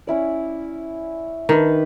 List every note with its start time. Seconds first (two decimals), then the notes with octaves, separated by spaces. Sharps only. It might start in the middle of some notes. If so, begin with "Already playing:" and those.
0.07 C#4 E4 D5
1.49 D#3 D4 B4